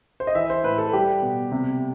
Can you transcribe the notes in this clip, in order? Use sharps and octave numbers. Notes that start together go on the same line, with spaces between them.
C5
D#5
E3 E5
C5
A2 B4
A4
G3 G4
B2
C3